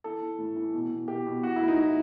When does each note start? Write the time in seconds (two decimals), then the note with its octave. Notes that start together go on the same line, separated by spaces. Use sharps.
0.04 E3 A4
0.22 E3
0.38 A2
0.56 E3
0.74 B2
0.91 B2
1.08 B2 G4
1.26 B2
1.43 E3 F#4
1.56 A2 E4
1.68 D#4
1.77 E3 E4